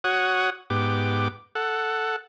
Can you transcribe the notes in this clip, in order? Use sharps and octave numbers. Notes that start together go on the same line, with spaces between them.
F#4 C#5 F#5 D#6
G#2 B3 G4 D6
A4 F#5